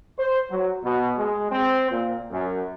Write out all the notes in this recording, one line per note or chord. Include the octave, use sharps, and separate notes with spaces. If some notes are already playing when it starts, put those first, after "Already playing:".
C5
F#3
B2
G#3
C4
A#2
F#2